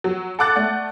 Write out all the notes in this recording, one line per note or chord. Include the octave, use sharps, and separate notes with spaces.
F#3
A4 F#5 D6 F#6 A6
A3 D5 F#5